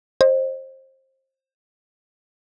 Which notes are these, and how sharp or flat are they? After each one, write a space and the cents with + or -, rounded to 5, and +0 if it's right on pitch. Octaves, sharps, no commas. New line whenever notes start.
C5 +25 D#5 -10